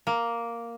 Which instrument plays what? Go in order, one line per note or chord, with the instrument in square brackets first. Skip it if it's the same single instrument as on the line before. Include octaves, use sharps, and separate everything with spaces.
[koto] A#3